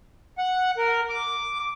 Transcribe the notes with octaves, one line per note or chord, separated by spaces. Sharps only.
F#5
A#4
D6